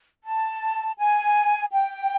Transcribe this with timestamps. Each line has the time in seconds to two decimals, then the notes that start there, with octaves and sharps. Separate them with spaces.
0.24 A5
0.98 G#5
1.72 G5